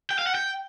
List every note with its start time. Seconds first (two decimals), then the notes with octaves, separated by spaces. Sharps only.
0.11 G5
0.19 F5
0.27 F#5
0.35 G5